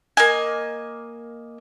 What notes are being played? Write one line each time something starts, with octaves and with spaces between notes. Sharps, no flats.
A#3 D#5 G#5